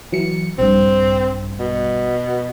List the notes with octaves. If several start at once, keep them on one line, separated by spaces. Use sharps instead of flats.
E3 F#3 C#7
A#1 G2 C4
B2